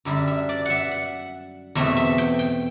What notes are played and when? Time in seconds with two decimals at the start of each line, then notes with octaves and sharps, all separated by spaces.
0.05 F#2 D3 G3 D4 E5
0.27 E5
0.49 D5
0.66 E5 F#5
0.91 F#5
1.75 E2 B2 A3 C4 E5
1.97 E5
2.18 G5
2.39 G5